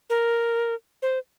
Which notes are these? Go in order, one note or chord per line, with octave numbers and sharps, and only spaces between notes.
A#4
C5